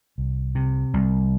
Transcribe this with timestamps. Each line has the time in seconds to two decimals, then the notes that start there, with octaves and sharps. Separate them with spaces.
0.18 C2
0.55 C3
0.94 C2